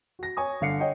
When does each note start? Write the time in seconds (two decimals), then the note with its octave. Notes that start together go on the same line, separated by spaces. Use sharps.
0.19 F#4 A#6
0.37 C#5 G#5 C#6 D#6
0.61 G1 D3 F5 C7 C#7
0.80 C#5 D#5 F#5 G5